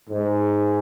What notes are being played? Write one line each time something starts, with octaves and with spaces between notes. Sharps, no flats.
G#2